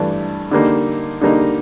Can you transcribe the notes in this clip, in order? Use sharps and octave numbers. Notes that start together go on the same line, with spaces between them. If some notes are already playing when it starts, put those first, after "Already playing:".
Already playing: G2 E3 A3 D4
D3 G3 A#3 D#4
D3 G3 A#3 D#4